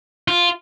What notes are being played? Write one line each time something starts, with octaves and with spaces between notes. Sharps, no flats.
F4